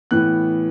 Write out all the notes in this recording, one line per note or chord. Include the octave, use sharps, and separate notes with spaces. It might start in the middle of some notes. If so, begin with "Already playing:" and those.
A2 E3 B3 F#6